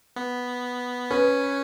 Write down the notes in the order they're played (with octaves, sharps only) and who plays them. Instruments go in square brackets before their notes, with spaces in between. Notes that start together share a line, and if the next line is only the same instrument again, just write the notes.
[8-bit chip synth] B3
[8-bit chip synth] C#4 [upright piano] B4